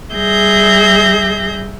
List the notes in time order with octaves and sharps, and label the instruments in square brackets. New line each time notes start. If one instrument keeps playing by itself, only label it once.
[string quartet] G3 G#4 E5 G6 A#6